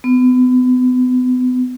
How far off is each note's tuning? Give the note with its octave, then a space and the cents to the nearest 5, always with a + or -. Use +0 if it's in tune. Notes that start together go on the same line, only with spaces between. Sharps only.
B3 +35